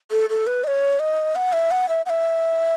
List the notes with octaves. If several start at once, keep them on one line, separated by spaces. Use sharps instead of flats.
A4
A4
B4
D#5
C#5
D#5
F#5
E5
F#5
E5
F#5
E5